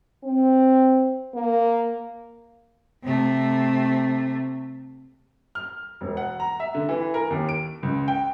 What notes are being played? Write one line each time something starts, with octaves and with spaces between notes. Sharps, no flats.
C4
A#3
C3 A3
F6
E1
F#5
A#5
E5
D3
E3
A#4
D#2
D7
C#2
G5